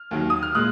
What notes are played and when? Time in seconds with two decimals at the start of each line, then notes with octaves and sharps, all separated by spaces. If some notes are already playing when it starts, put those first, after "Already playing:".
Already playing: F6
0.11 D#2 D#3 F#3
0.30 D#6
0.43 F6
0.55 A#2 G#3 D#6 F#6